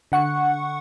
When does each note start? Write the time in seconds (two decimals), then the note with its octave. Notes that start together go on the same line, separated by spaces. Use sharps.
0.12 D3 F#5 C#6 C#7